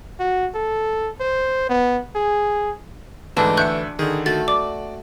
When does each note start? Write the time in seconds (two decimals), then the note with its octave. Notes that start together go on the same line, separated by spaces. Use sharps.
0.20 F#4
0.55 A4
1.20 C5
1.69 B3
2.16 G#4
3.37 D2 G#2 E3 A3 D4 D#4 A5
3.57 D2 E5 C#6 F#6 G6 C#7
3.99 D3 D#3 G#4
4.26 A3 F#4 A6
4.48 D5 D6